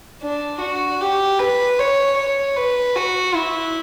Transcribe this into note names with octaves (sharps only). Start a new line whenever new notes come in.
D4
F#4
G4
B4
C#5
C#5
B4
F#4
E4